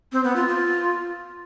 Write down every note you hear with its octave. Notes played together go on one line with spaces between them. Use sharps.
C4
B3
F4
F4